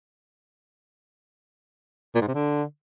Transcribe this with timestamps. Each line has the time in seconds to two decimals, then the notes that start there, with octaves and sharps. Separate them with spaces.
2.15 A#2
2.21 G#2
2.28 C3
2.34 D3